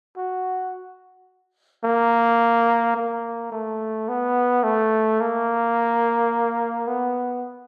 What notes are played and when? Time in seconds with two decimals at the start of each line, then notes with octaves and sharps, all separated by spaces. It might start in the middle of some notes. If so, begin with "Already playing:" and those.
0.17 F#4
1.85 A#3
2.97 A#3
3.52 A3
4.09 B3
4.64 A3
5.20 A#3
6.87 B3